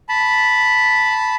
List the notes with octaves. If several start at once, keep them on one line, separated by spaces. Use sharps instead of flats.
A5 B5